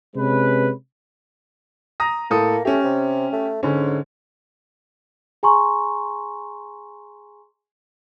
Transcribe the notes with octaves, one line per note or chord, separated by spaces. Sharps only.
C3 G#3 C#4 B4
A#5 D#6 A#6
A2 A#3 A4 D#6
A3 C#4 G4
C3
A3
G#2 D3 C#4
G#4 G#5 A#5 C6 C#6